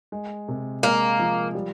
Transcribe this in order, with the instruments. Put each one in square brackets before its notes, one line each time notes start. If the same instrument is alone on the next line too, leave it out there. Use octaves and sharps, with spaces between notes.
[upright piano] G#3
C3
[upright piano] G#3 [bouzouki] A#3
[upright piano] F3
G3